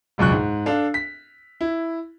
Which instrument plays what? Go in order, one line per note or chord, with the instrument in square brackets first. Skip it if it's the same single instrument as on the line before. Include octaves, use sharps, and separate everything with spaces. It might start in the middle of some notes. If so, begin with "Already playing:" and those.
[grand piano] E1 C#2 F#2 C#6 F#6
G#2
D4 A4 F5
B6
E4